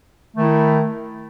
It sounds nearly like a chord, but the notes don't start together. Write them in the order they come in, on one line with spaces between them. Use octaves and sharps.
A3 D#3 E4